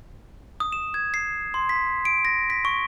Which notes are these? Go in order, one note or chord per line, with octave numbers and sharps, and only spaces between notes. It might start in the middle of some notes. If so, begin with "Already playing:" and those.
D#6
E7
G#6
C7
C6
B6
D7
A#6
B6
C#6